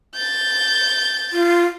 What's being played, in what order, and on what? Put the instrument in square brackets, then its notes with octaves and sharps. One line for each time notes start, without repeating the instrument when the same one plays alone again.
[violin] G6 A6
[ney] F4